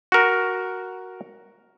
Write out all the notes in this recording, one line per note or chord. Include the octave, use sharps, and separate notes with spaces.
F#4 A#4